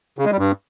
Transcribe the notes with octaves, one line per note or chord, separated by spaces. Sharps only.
C#3
G#3
G3
G2